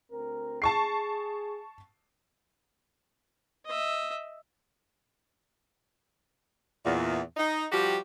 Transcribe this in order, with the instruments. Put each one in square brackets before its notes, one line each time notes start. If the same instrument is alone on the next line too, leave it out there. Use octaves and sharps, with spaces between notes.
[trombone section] D2 C4 A#4
[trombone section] G#4 [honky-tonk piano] A5 C#6 C7
[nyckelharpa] D#5 E5
[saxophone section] E2 A#2
D#4
F3 G3 F#4 G4